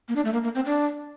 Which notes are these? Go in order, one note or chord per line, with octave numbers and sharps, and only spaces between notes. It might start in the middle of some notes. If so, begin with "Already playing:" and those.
A#3
D4
A3
A#3
A#3
C4
D4